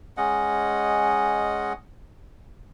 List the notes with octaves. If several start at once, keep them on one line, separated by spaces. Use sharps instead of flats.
G#3 C#4 D#5 F#5